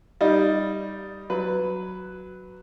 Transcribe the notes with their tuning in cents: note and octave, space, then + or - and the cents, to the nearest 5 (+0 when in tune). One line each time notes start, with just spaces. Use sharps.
G3 +0 D#4 +0
F#3 +0 B4 +5